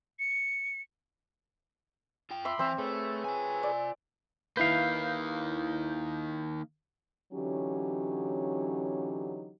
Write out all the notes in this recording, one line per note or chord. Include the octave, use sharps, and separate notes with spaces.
C#7
F4 G5
E5 B5 C6 D6
E3 C4 E5 E6
A3 G#4 B4 C#5
F4 G#5
D5
D#3 A#3 E4 B4 F5 G6
D3 E3 F#3 C#4 D#4 G4